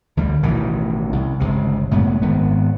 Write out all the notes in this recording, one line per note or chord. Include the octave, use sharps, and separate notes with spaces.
D2 D3 G3
A1 B2 D#3 E3
C2
G1 C#2 C3
C#2 F#2 A2 B3
G#1 G#2 D#3 B3